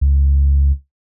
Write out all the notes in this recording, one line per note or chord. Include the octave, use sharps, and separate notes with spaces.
C#2